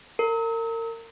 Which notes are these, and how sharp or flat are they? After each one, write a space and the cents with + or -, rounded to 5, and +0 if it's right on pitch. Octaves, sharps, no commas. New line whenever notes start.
A#4 -35